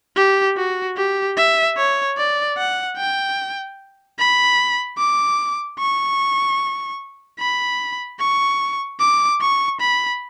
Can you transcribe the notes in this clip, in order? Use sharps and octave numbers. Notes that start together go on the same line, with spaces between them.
G4
F#4
G4
E5
C#5
D5
F#5
G5
B5
D6
C#6
B5
C#6
D6
C#6
B5